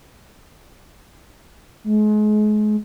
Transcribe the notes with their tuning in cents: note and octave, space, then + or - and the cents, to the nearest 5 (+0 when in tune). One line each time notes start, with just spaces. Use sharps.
G#3 +35